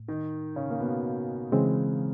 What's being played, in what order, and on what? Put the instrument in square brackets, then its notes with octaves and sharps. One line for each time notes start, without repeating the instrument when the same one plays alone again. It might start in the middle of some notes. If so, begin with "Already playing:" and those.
Already playing: [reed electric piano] A2
[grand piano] D#3 D#4
C#3 C#4
A#3
B2 B3
[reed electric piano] C#3 E3 G#3 C4